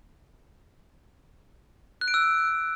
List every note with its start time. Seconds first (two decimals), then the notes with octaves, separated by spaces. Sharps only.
2.01 F#6
2.08 D7
2.14 E6